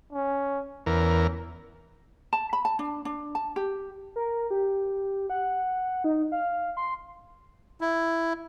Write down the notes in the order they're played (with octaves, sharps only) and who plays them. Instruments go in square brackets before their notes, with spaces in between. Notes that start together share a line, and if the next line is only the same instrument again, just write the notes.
[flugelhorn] C#4
[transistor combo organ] E2 A#4 [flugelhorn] C#4
[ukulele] A5
B5
A5
D4
D4
A5
G4
[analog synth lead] A#4
G4
F#5
D#4
F5
C6
[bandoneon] E4